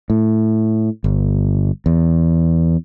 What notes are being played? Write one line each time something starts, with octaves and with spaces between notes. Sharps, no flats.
A2
G1
E2